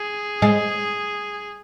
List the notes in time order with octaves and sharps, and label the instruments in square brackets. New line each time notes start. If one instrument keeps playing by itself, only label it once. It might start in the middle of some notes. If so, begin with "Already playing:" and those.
Already playing: [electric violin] G#4
[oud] G#3